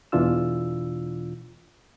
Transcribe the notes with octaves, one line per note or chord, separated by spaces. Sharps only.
E2 B2 E3 D4 F4 E6